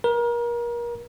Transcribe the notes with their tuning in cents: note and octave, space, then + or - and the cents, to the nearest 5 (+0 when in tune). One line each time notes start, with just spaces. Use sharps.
A#4 +30